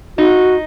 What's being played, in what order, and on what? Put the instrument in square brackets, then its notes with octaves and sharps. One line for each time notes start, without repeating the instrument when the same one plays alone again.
[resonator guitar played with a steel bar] D#4 [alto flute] F#4